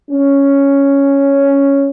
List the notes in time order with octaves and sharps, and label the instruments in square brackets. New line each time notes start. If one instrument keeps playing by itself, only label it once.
[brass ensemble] C#4